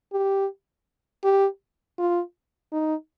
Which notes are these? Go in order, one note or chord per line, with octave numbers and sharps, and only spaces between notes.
G4
G4
F4
D#4